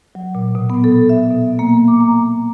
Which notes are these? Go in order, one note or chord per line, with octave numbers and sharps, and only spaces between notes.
F#3
A#2
B2
B3
A4
E5
B2
A#3
D6
A#5